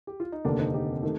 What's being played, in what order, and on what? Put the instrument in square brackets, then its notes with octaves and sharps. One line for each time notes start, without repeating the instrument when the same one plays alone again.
[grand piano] G4
F4
D#4
[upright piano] F1 D#2 D3 [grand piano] A#3 D4
[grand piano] C4 D#4
D#4 G4
[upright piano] D#3 A3